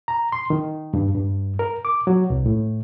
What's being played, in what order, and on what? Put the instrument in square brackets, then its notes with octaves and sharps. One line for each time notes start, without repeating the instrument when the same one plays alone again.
[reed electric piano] A#5
C6
D#3
G2
G2
A#4
D6
F#3
C2
A2